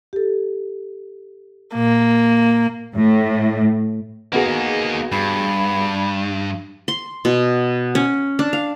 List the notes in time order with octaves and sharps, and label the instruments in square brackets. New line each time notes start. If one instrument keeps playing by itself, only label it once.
[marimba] G4 A4
[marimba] A#2 [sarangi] A#3
[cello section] A2
[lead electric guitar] A#3 D#4 [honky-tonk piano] B3 F#4 G#4
[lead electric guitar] G2 [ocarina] B5
[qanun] C6
B2
C#4
D4
F5